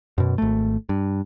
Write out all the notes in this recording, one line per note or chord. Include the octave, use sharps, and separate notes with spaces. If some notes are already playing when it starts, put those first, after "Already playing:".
F#2 B2
G#1 A3
G2